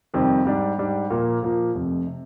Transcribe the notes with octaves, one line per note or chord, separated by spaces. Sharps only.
F2 C3 D#3 G3 C4
G#2 G3 D4
G#2 G3 D4
A#2 F3 A#3
A#2 F3 A#3
F1 F2 C3
C3